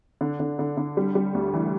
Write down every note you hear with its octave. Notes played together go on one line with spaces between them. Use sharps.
D3
D3
D3
D3
G3
G3
D2
E3